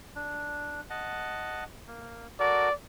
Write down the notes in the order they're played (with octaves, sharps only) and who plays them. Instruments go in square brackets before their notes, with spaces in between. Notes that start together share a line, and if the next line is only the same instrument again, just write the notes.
[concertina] D4
D#5 F#5 A5
A#3
[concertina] F#4 A4 A#4 [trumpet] D5